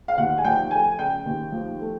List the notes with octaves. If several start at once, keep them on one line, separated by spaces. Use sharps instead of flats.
F5
D#2 F#5
G#5
F3 G5
A3 G#5
C#3 G5
D#2
F3
A3